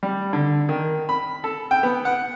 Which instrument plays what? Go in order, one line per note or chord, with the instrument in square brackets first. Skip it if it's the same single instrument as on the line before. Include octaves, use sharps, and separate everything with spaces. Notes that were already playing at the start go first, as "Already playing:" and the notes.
[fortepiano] G3
D3
D#3
B5
A4
G5
B3
F#5